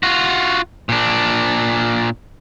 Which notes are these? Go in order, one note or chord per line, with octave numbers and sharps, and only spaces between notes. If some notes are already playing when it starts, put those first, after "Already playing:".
F4 F#4
A#2 D4